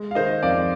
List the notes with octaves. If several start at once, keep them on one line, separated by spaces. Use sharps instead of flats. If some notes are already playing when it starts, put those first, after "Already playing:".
Already playing: G#3
F5
D#3 C5 D#5
F2 D5 F5